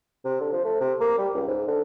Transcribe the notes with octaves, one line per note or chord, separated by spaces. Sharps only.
C3
D3
F3
A3
C3
A#3
G3
C#2
G#2
D3